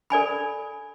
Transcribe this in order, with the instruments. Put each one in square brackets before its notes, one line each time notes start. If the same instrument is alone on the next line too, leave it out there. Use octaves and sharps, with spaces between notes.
[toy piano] A4 D5 G#5 B5